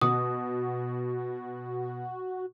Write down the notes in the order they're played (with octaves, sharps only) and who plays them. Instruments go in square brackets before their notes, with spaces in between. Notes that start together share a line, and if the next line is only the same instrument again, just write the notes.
[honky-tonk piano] B2 [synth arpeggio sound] F#4 [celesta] D#6